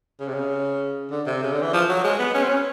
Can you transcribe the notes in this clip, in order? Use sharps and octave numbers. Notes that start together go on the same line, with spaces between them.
C#3
C3
C#3
D3
C3
C#3
D3
E3
F3
F#3
G#3
B3
C#4
C4
C#4